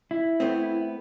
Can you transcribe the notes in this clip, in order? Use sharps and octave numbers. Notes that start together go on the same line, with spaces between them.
E4
A3 B3 C4